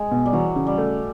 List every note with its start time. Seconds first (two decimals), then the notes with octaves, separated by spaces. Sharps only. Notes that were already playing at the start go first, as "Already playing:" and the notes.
Already playing: G#3
0.11 B2
0.26 G3
0.33 E3 F#3
0.56 C#3
0.67 G3
0.78 A3